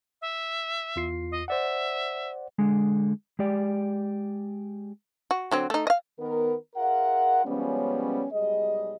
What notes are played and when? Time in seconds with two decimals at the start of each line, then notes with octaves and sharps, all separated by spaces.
0.21 E5
0.96 E2 F4 C7
1.31 D#5
1.48 C5 D5 E5 F#5
2.59 D3 G#3
3.39 G#3 G4 D5
5.31 F#4
5.51 D3 F#3 C4
5.70 A3 D#4
5.87 D#5 F5
6.19 D#3 B3 A#4
6.76 F4 G#4 A#4 E5 F#5
7.45 C#3 F3 G3 G#3 B3 C#4
8.31 B1 G3 G#3 G#4 D#5